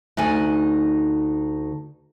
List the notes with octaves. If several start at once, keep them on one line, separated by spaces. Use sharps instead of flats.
D2 D#4 D5 G#5